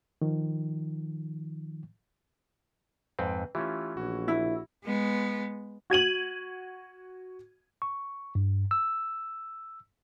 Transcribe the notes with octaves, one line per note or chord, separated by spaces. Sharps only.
D#3 F3
F2 G#2 C4 B4
E3 A3 C#4 F4 G4 E5
A#1 F#4
E4
G#3 B3
F#4 G#6 D#7 F#7
C#6
G2
E6